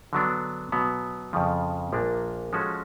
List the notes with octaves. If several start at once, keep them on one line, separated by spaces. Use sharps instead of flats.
D3 F#3 B3 D4
B2 F#3 B3
F2 C#3 F3
A#1 A#2 F3 A#3 D4
F3 G#3 C#4 F#4 A4